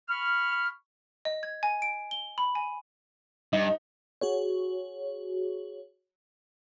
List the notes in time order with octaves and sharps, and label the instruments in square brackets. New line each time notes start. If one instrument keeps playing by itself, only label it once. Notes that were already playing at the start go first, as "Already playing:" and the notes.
[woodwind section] B5 C#6 F6
[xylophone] D#5
G#6
G#5
D7
G7
B5
G#5
[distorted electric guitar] G2 [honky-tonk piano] D#4
[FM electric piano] F#4 G#4 C#5